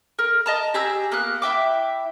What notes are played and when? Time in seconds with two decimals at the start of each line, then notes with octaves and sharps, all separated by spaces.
0.19 A#4
0.46 D#5 A5 A#5
0.74 G4 G#4 A#5 E6
1.12 A#3 B3 F#6
1.42 E4 E5 G5 D6